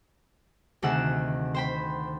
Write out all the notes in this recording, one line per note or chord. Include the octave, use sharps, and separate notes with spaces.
D2 C3 D#3 G#4 F#5 E6
C5 G5 B5